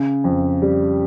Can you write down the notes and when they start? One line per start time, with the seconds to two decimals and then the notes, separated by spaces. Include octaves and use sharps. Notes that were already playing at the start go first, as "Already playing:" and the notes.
Already playing: C#3
0.24 F2
0.62 G3